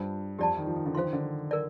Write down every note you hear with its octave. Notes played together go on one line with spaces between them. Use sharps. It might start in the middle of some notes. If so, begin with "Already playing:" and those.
Already playing: G2 D4 F4 C5 A5
F2 G4 D5 A5
D#3
F3
D#3
D3
F3 C5 F5 C6
D#3
D3
A#4 D5